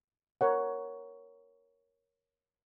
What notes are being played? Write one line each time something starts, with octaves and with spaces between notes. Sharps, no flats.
A#4 C#5 F#5